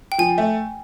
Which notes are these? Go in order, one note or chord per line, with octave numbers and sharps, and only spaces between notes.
G5
F3 G#5
A3